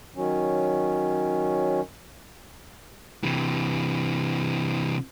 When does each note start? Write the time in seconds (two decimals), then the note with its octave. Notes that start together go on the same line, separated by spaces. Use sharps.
0.16 D#3 F#3 C#4
3.23 C3 E3